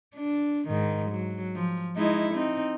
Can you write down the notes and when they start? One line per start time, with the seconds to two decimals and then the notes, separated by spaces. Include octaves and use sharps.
0.15 D4
0.68 G#2 D#3
1.10 F#3
1.56 F3
1.96 G#3 D#4 E4
2.34 C4 D#4